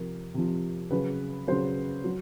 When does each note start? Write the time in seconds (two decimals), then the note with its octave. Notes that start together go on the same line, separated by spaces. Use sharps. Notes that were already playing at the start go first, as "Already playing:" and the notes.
Already playing: C3 F3 A#4
0.34 C3 F3
0.91 C#3 F#3 B4
1.47 C#3 F#3 C5
2.04 F#3